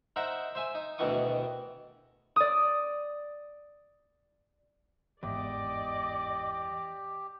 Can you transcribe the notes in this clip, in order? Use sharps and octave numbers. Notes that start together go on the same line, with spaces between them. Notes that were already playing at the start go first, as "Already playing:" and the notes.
D#4 A#4 C5 E5 F#5 A#5
C5 E5 G#5
D#4
D2 B2 D#3 E3 C#6 D#6
D5 D#6
G1 E2 G#2 G4 D5 D#5 D6